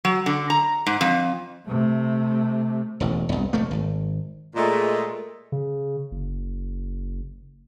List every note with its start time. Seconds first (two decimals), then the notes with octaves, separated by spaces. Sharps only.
0.05 F#3
0.26 D3
0.50 A#5
0.86 G#2
1.01 F2
1.67 C3 A3
3.00 E1 A1
3.29 E1 C2
3.53 F1 A3 A#3
3.71 G#1
4.55 A#2 G#3 A3
5.52 C#3
6.11 F#1